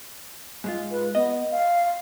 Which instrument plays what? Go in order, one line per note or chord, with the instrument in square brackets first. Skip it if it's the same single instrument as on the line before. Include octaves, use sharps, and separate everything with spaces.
[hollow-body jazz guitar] G#2 G#3 F4
[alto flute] B4
[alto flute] B3 [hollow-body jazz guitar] D#5
[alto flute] F5